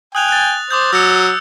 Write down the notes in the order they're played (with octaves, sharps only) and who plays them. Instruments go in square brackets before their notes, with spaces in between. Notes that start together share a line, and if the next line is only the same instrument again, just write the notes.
[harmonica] G5 G#5 [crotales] D#6 F#6 F7
[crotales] F#6 A6
[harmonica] C5 [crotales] D6 D#6 G6
[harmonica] F#3 [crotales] E6 C#7